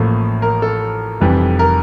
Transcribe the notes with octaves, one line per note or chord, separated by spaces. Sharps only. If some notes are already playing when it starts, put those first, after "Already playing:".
Already playing: A1 A2 F3 A#3 A4
A#4
A4
F1 F2 E3 G3
A#4